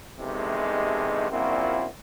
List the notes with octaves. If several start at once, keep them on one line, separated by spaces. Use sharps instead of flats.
E2 G2 C3 G#3 A3 D#4
A#1 F#2 A#2 C4 E4 F#4